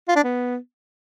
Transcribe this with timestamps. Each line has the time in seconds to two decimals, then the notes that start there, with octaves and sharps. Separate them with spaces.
0.08 F4
0.16 D4
0.24 B3